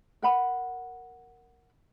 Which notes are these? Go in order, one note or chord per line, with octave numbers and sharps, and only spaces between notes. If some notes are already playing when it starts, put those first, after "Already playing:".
A#4 F#5 B5